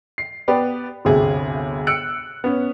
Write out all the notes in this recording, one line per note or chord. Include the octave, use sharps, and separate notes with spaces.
C7
B3 G4 B4 D5
G1 D2 C3 G#4
E6 F#6 C#7 D7
B3 C#4